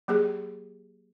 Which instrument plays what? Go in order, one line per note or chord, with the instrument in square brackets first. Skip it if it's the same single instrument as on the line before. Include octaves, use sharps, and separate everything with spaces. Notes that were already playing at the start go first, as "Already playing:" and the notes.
[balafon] F#3 A#3 G4 G#4